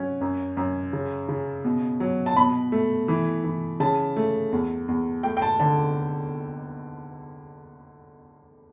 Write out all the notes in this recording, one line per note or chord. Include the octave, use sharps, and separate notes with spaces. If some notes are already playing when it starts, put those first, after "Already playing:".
Already playing: F#3 C#4
F#2
F#2
C#3
C#3
B2
F#3
A5
B2 B5
A3
E3
E3
C#3 A5
A3
E2
E2
A3 G5
G5
A5
D3 A5